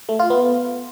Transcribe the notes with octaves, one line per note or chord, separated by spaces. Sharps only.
A3
F4
B3